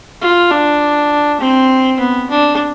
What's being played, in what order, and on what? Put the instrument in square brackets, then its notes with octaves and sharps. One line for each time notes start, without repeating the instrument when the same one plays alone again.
[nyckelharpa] F4
D4
C4
B3
D4